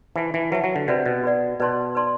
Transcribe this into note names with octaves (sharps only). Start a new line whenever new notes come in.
E3 B4 E5 A5
E3
F#3 B4 E5 A5
F#3
D3
C3 F#4 B4 D5 F#5
B2
F#4 B4 D5 F#5
B2 B4 D5 A5 C6
B4 D5 A5 C6